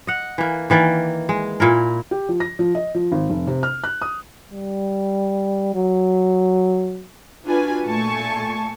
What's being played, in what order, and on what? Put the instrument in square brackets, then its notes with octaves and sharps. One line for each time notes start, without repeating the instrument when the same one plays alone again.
[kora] D#5 F#5
E3 A#3
D#3 E3 A#3 D5
G#3
A#2 E4 A#4
[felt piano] G4
F3
A#6
F3
D#5
F3
G#1
F1
C3
F6
F#6
D#6
[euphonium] G3
F#3
[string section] D4 F4 F#4 B4 G#5
A#2 A3 G#5 A5 C#6